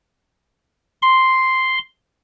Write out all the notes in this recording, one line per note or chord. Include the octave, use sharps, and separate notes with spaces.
C6